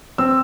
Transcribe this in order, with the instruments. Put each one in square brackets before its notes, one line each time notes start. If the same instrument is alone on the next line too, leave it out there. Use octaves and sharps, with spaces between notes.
[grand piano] C4 E6